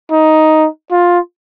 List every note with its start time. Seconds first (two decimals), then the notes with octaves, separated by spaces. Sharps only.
0.12 D#4
0.91 F4